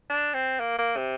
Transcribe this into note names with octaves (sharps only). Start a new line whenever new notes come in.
D4
C4
A#3
A#3
C3